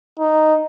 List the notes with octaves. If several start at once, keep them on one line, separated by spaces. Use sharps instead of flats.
D#4